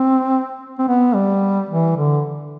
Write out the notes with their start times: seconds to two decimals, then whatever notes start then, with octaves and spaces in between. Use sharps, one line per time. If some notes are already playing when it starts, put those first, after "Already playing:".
Already playing: C4
0.79 C4
0.88 B3
1.15 G3
1.69 E3
1.96 D3